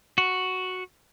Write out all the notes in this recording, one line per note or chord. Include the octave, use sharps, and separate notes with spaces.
F#4